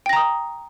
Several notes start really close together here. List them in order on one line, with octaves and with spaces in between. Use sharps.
G5 A#6 A#5 D#6